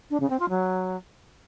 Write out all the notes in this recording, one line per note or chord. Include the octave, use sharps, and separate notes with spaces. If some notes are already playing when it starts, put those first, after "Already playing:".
D4
C#3
C4
F4
F#3